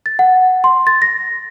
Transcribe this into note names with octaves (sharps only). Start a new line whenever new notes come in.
A6
F#5
C6
A6
A#6